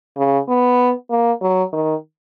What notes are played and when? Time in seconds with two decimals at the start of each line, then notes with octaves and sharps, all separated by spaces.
0.17 C#3
0.48 B3
1.10 A#3
1.41 F#3
1.73 D#3